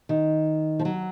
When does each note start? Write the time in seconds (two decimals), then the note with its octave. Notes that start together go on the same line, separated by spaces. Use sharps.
0.09 D#3
0.79 F3
0.85 F#3